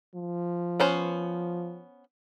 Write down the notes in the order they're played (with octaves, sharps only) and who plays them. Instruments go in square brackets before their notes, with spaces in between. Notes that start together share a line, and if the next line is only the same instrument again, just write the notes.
[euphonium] F3
[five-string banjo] B3 C#4 C5